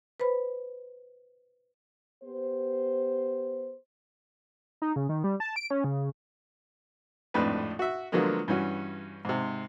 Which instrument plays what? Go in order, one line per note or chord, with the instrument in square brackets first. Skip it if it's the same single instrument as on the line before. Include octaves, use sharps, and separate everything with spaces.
[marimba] B4 C5 B5
[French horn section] B3 G4 C5
[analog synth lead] D#4
C#3
D#3
G3
A5
D7
C#4
C#3
[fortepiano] G#1 F2 A2 D4 B4
F#4 E5
D3 F3 F#3 G#3 A#3 B3
G2 E3 C#4 F#4
G#2 C3